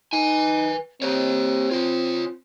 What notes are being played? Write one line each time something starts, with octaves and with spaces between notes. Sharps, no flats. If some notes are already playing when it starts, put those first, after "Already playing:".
D#4 B4 G#5
C4 G4 C#5
F4 C#5